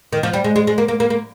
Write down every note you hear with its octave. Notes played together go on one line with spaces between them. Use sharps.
D#3
F3
G3
G#3
G#3
G#3
A#3
A#3
A#3
A#3